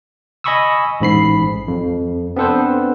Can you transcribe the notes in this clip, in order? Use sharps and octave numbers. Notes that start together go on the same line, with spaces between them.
D#5 G#5 B5 C#6 D#6 E6
A1 G#2 B5 C7
F2
B3 C4 D4 A4 B4 C5